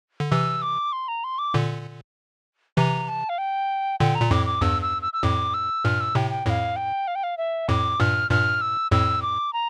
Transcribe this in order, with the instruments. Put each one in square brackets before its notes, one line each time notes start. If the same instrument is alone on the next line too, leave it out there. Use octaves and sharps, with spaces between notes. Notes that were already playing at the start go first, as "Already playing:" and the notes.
[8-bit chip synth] D3
[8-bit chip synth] C3 E3 [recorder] E6
[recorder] D6
C6
A#5
C6
D6
[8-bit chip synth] A#2 D3
[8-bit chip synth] C3 E3 [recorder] A#5
[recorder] A5
F5
G5
[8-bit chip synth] A#2 D3 [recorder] G5
[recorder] A#5
[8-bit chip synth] A#2
[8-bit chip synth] F2 A2 [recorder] D6
[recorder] D6
[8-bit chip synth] E2 G2 [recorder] E6
[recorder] E6
E6
E6
[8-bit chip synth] F2 A2 [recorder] D6
[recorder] E6
[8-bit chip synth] G2 A#2 [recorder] F6
[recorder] E6
[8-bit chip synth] A2 C3 [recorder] G5
[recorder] G5
[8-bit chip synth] F2 A2 [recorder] F5 G5
[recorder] G5
F5
G5
F5
E5
[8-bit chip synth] F2 A2 [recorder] D6
[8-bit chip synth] G2 A#2 [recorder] F6
[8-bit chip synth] G2 A#2 [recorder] F6
[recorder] E6
[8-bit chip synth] F2 A2 [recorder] E6
[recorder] D6
A#5